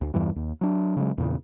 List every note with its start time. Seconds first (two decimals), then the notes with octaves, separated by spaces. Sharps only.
0.01 D2
0.14 E2 G2 E3 G3
0.36 D#2
0.61 F#3 D4
0.97 C#3 F#3 G#3
1.18 E2 A#2 C#3